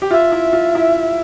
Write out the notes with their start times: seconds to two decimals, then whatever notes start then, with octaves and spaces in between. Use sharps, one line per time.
0.02 G4
0.11 F4 E5
0.32 E4
0.53 F4
0.75 E4